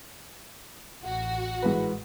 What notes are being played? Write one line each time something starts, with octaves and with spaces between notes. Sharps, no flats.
A1 F#4
G#2 E3 B4